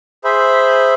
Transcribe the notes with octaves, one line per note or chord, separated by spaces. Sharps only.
G#4 C5 E5 B5